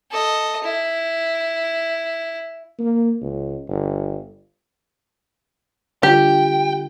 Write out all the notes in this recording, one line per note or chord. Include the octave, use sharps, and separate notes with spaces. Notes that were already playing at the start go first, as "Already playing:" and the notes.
A4 D#5
E4
A#3
C#2
G1
D3 G3 D4 F4 G4 G5